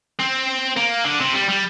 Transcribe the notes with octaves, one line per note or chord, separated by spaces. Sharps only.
C4
A#3
D3
C3
G3
G3